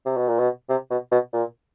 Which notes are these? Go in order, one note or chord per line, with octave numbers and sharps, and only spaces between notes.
C3
B2
A#2
B2
C3
B2
B2
A#2